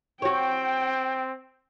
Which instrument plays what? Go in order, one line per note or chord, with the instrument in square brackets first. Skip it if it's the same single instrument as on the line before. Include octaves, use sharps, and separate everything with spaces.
[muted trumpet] C4 [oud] F#4 C#5 [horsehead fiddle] G5